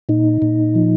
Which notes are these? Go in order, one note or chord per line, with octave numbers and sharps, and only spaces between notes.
A#2 D#4
A#2
F3